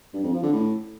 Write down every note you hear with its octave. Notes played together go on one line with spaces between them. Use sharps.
G2
F2
F3
D3
A2